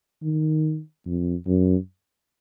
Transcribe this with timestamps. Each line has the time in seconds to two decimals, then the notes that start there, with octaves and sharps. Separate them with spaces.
0.22 D#3
1.06 F2
1.47 F#2